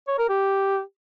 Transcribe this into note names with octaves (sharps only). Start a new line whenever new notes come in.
C#5
A#4
G4